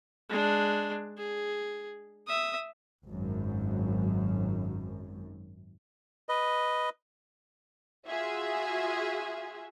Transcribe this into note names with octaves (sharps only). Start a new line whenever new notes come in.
G#3 D4
G#4
E5 D#6
G#1 F#2
B4 D#5
F4 F#4 G#4 E5